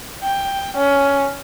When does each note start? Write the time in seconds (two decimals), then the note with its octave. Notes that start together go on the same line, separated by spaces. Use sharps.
0.25 G5
0.77 C#4